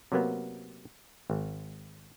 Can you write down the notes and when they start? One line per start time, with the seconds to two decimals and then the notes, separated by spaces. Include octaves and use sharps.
0.12 C3 F#3 A#3 B3
1.30 G#1